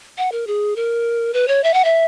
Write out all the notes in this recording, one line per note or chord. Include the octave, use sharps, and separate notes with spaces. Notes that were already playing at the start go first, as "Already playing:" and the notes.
F#5
A#4
G#4
A#4
B4
C#5
E5
F#5
E5